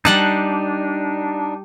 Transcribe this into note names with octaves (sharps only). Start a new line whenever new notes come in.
G3 D4 D#4 F#5 A5